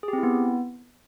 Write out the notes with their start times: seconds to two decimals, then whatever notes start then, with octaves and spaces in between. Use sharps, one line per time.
0.03 G#4
0.08 G4
0.13 C4
0.18 E4
0.23 B3